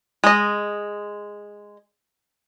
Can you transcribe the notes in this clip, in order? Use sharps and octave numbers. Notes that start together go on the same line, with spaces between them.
G#3 D#5